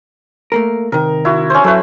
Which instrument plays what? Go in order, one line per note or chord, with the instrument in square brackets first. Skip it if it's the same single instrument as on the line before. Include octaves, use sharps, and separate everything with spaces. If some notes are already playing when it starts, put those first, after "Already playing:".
[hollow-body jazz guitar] A3 A#3 A#4
[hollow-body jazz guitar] C3 D#3 [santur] A#4
[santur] E4 F#4
C#4 C5
[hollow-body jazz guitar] F#3 [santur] A3 E4 B4